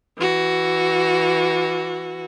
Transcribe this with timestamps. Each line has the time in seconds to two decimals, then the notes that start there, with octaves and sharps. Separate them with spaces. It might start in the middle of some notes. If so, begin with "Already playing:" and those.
0.18 E3 F#4